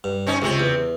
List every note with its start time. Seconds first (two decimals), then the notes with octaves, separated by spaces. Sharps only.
0.04 G2
0.26 C4 C#4 D#4
0.42 C#2 C3 G#3 C4
0.59 E2